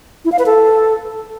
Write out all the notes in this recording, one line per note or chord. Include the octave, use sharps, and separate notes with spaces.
E4
F5
B4
A4